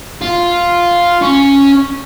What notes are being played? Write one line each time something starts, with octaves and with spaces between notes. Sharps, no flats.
F4
C#4